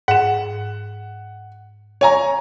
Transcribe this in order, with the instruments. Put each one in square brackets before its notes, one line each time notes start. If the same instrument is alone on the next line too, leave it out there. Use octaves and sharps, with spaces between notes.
[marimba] G#2 [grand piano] F#5 E7
[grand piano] C#5 G#5 A#5